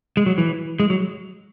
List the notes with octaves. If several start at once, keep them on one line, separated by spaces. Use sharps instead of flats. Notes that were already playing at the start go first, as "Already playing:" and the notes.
G#3
F#3
E3
G#3
F#3